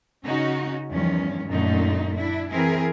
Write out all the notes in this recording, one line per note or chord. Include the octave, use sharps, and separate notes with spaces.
C#3 C#4 D#4 F#4
E2 G2 D#3 F3 C#4
F#2 A#2 D3 A3 D#4
D4 E4
E3 C4 E4 G#4 A#4